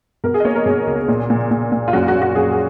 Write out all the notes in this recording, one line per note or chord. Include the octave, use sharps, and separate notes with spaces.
B2 A#4
G#4
D#5
A#3 C#5
A#4
B2 G#4
C#2
A#2
A#2
A#2
A#2
F4
F#2 F#4
F4
F#4
F#2
F#4
F#2 G#4
G#4